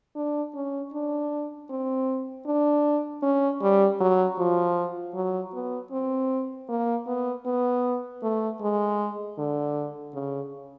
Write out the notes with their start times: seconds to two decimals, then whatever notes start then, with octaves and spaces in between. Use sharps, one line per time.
0.16 D4
0.54 C#4
0.93 D4
1.70 C4
2.46 D4
3.23 C#4
3.62 G3
4.01 F#3
4.38 F3
5.15 F#3
5.53 B3
5.92 C4
6.69 A#3
7.07 B3
7.46 B3
8.23 A3
8.61 G#3
9.38 D3
10.14 C#3